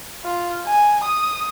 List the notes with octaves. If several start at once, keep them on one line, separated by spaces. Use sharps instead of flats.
F4
G#5
D#6